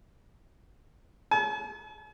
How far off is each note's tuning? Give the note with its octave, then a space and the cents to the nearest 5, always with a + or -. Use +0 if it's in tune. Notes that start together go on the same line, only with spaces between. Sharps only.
G#5 +45